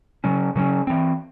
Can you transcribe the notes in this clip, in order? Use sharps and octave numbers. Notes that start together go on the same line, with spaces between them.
C#3 F#3 C#4
C#3 F#3 C#4
E3 C4